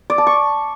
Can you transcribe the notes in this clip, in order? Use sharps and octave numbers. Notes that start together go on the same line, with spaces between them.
D5
A5
C#6